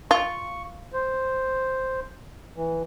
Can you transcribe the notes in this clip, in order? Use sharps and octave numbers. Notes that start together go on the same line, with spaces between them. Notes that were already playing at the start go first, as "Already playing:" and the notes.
F4 C#6
C5
E3